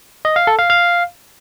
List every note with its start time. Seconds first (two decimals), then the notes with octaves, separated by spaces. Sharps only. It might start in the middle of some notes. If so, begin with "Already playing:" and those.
0.25 D#5
0.36 F5
0.47 A4
0.59 F5
0.70 F5